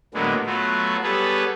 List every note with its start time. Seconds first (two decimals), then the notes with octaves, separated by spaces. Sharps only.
0.14 A2 D3 F#3 G#3 A#3 B3
0.46 F#3 A3 B3 F4 F#4
1.03 G3 B3 G#4 A4 B4 C#5